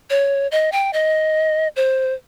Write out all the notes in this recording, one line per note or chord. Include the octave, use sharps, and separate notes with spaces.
C#5
D#5
G5
D#5
C5